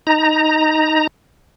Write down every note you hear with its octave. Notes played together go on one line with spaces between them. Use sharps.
D#4 A#5